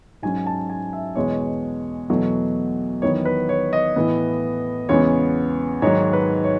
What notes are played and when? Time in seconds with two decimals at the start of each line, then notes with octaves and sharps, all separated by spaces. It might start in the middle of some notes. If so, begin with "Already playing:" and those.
0.22 G#2 F#3 C#4 G#5
0.46 A5
0.70 G#5
0.93 E5
1.16 E2 B2 G#3 B3 C#5
2.10 E2 B2 F#3 A3
3.02 E2 D#3 F#3 B3 C#5
3.25 B4
3.49 C#5
3.73 D#5
3.96 A2 E3 B3
4.89 E2 C#3 G#3 B3 C#5
5.82 G#2 D#3 F#3 C#5
6.13 B4
6.44 C#5